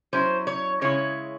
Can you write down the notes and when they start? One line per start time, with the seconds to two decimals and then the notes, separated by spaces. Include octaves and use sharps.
0.13 F#3 C#4 E4 C5
0.47 C#5
0.81 C#3 G#3 C#4 E4 C#5